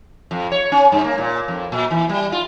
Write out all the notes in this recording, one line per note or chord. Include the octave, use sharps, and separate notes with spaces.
F2
C#5
C#4
G2
A#3
A#2
F2
A#2
E3
G3
F4